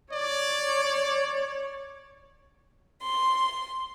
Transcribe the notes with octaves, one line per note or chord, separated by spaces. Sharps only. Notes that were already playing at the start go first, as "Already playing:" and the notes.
C#5 D5
C6